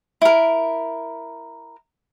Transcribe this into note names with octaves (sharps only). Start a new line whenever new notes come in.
E4 A#4